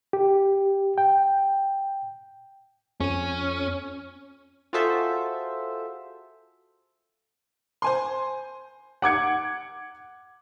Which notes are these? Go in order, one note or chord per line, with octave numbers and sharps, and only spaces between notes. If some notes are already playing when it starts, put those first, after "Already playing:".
G4
G5
F2 C#4 D#7
F4 F#4 G#4 A4 C5 E5
C5 G#5 C6
F#5 D6 G#6 C#7